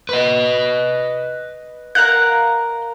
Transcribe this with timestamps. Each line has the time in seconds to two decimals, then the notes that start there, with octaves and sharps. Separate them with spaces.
0.09 B4 D#5
1.95 A#4 F5 F#5 F#6